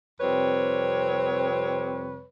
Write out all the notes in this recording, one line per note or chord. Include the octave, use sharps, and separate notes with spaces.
F2 C3 G3 C4 B4 C#5